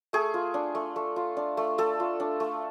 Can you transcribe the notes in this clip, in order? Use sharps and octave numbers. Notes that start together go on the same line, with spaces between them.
A3 G#4
F4
D4
A3
A3
F4
D4
A3
A3 A4
F4
D4
A3